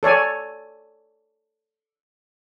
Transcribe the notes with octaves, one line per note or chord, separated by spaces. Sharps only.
A4 C#5 D5 G#5